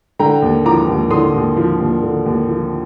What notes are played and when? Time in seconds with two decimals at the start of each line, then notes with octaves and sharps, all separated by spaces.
0.19 D3 G5 A#5
0.42 D#2
0.65 F3 A#5 D6
0.88 D#2
1.10 D3 C6 D#6
1.34 D#2
1.56 F3
1.80 D#2
2.03 D3
2.26 D#2
2.48 F3